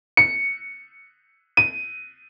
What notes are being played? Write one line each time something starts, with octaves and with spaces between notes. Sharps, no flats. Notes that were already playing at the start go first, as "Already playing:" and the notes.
C#7
D#7